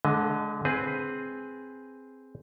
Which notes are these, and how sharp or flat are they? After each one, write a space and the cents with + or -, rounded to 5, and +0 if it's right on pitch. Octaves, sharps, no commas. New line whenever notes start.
D3 -10 G#3 +35 D#5 +5
C4 +0 G#4 +0 B4 +5